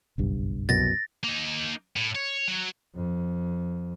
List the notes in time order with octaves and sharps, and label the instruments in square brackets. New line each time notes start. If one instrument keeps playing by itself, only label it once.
[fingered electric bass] F#1 B1 G2
[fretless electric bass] C2 F#2 B2 [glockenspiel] A6 A#6
[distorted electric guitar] A#3 D#4
A2
C#5
F#3
[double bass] F2